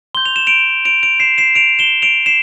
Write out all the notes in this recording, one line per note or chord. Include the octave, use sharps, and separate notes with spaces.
C6 G6 G7
F7
E7
D7 F7
D7 F7
D7 F7
C7 E7
C7 E7
D7 F7
E7 G7
D7 F7
C7 E7